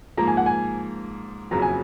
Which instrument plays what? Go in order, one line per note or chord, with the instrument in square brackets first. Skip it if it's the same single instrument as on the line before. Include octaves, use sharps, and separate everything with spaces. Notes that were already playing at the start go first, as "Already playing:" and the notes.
[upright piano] G#2 F3 A#3 [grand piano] A#5
[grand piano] G#5
F#5
G#5
[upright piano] F#1 F2 C#3 F#3 [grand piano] A#5
[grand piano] G#5